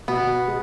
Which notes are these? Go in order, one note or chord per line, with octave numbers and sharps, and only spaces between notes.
B2 B3
G#3